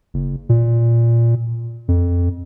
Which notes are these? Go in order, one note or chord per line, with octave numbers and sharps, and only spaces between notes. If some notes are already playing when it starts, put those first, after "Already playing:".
F#1
A#2
F2